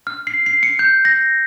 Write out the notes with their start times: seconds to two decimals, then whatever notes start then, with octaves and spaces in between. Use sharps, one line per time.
0.07 F6
0.27 C7
0.46 C7
0.63 C#7
0.79 G6
1.05 A#6